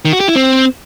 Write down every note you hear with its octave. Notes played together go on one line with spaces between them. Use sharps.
D#3
F#4
G4
E4
C4